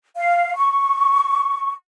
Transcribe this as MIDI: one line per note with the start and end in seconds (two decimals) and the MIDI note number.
0.17 0.55 77
0.56 1.73 85